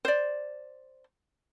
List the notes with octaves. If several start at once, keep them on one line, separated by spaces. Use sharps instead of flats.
C5 D5